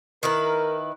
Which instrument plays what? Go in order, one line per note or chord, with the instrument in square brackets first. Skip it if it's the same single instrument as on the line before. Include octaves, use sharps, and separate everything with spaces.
[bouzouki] D#3 E4 B4 [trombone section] A#4